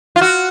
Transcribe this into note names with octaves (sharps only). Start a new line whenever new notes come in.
F4
F#4